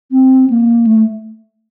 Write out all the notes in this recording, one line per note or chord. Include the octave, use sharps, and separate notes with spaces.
C4
A#3
A3